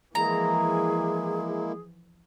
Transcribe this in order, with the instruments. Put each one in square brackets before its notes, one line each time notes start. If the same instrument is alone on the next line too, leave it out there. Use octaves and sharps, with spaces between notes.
[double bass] E3 F3 [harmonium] G#3 A#3 E4 [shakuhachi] G#4 [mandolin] A#5